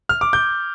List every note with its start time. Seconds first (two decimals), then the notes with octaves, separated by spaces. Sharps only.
0.09 F6
0.21 D6
0.33 G6